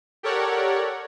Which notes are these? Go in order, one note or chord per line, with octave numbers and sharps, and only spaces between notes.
G4 A4 A#4 C#5 D5 F#5